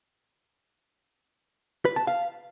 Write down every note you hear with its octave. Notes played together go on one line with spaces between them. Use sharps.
B4
A5
F5